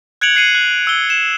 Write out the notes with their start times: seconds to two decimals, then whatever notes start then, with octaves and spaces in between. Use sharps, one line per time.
0.21 F#6 G#6 C#7 D7 F7 F#7
0.35 F#6 C7 C#7 D#7 F#7
0.55 F#6
0.87 E6 G7
1.10 E7